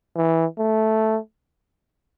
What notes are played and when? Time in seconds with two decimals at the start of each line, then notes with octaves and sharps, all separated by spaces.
0.16 E3
0.58 A3